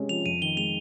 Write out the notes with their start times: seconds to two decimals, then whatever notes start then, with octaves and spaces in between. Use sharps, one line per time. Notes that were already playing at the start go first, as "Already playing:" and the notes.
Already playing: C3 G#3 C#4
0.09 F3 F7
0.26 F2 D#7
0.42 D#3 G7
0.57 G#3 F7